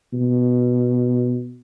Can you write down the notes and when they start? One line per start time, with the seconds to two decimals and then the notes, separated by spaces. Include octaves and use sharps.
0.13 B2